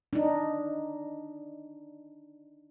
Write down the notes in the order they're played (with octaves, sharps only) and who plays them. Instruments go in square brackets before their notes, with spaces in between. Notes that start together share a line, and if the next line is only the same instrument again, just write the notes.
[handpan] D4 D#4